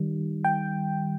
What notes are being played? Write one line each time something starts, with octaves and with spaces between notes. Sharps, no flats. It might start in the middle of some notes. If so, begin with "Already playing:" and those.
Already playing: D#3 G3
G5